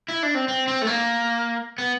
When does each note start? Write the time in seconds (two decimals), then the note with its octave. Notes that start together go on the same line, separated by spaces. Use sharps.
0.08 E4
0.23 D4
0.35 C4
0.48 C4
0.68 C4
0.82 A3
0.87 A#3
1.78 B3